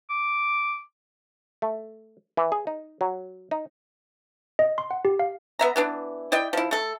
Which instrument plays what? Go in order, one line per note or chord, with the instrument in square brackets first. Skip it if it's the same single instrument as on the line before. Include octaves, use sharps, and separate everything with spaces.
[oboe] D6
[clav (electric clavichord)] A3
E3
G#4
D#4
F#3
D#4
[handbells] D#5
C6
F#5
G4
F5
[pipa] B3 E5 A#5
E3 B3 D4
E4 D5 D#5 G5
F3 E4
A3 A4